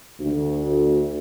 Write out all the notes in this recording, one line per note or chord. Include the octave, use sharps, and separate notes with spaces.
D2